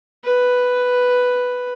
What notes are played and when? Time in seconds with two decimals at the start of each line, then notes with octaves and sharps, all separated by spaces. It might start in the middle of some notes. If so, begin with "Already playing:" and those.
0.24 B4